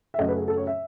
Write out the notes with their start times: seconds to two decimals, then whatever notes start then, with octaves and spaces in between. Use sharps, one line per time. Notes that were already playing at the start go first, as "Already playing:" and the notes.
0.14 E5
0.18 F#2 C#3 F#3 A3 D#5
0.28 B4
0.38 G#4
0.48 A4
0.57 C#5
0.67 E5